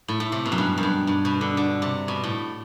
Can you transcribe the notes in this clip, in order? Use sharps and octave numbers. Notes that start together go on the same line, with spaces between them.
A2
A2
C3
B2
F#2
G2
F#2
G2
G2
B2
D3
D3
C3
B2
A2